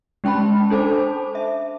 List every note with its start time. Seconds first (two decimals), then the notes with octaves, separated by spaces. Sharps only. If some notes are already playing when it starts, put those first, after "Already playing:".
0.24 G#3 C#4 G5 A5 B5
0.70 D4 A4 C5 A5 D6
1.35 E5